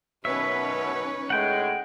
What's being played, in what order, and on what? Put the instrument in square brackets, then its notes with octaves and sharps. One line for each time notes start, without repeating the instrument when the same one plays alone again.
[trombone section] F#2 B2 [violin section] C#4 B4 [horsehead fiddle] D#4 C#5 [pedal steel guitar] E5
[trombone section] A2 G#3 [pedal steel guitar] F#5 G5